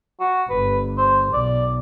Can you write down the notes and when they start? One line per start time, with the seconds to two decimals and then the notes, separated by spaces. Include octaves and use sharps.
0.20 F#4
0.50 G1 B4
0.97 C5
1.33 B1 D5